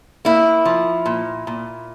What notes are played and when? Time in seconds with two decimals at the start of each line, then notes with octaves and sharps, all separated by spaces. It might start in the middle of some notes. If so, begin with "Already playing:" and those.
0.25 A#3 E4
0.65 F3
1.06 A#2
1.47 A#2